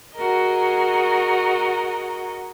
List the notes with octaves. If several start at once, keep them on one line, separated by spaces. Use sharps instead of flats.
F#4 G#4 A#4 D#5